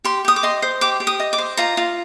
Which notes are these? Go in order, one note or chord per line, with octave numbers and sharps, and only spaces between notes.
G4 C6
G4 D#6
D6
D#5 C6
C5
G4 D6
G4
D#6
D#5
D6
C5
F4 A#5
F4